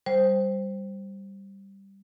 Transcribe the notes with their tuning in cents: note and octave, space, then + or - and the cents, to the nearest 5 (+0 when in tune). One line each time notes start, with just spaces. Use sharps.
G3 +0 C5 +0